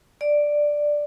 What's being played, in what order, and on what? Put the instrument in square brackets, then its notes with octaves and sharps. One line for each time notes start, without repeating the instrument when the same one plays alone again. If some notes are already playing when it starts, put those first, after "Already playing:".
[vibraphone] D5